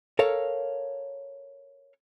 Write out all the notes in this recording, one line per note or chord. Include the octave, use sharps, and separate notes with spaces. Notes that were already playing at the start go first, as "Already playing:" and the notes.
A4 A#4 C#5 F5